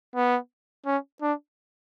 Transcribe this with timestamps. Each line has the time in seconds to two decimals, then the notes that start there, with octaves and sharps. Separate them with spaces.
0.15 B3
0.86 C#4
1.22 D4